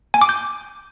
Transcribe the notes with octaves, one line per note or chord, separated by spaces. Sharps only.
G#5
D6
G6